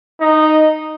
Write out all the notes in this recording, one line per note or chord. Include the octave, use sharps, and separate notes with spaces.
D#4